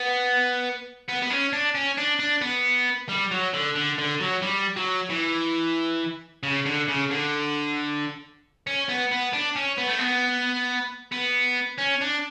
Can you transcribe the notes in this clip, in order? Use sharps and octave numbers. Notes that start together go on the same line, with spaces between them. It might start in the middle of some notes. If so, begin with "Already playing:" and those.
Already playing: B3
B3
B3
C#4
D4
C#4
D4
D4
B3
G3
F#3
D3
D3
D3
F#3
G3
F#3
E3
C#3
D3
C#3
D3
C#4
B3
B3
D4
C#4
B3
A3
B3
B3
C#4
D4